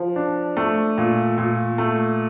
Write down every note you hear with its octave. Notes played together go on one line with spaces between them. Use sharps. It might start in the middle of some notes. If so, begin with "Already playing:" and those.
Already playing: F3
D4
A3
A#2
A#2
A3